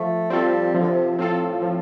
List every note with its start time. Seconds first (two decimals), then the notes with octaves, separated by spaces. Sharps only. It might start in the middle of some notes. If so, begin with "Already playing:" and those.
Already playing: F3 A3
0.30 G3 C4 F4 A4
0.74 C3 F3
0.81 D3
0.88 C3
1.12 C3
1.18 A2 C4 F4 A4
1.62 F3